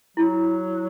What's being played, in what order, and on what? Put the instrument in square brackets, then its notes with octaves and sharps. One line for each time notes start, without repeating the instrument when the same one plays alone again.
[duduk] F#3 [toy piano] E4